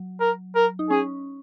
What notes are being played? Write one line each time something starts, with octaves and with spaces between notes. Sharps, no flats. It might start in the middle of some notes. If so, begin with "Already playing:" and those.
Already playing: F#3
A#4
A#4
D#4
C#4 G#4